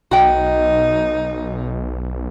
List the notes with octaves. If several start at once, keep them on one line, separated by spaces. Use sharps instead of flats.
B1 D#4 F#4 G5